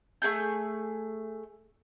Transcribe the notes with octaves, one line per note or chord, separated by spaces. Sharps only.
A3 D#4 G#4 G6